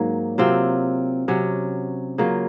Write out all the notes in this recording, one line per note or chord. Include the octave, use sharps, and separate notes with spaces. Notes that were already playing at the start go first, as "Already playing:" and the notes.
Already playing: G#2 F#3 A#3
C3 F#3 C4 F4
C3 F#3 C#4 F#4
C#3 F#3 A#3 F4